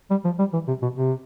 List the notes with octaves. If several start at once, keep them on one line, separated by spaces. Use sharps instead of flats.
G3
F3
G3
E3
C3
B2
C3